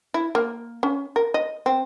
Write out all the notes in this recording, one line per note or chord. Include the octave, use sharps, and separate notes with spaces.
E4
A#3
C#4
A#4
D#5
C4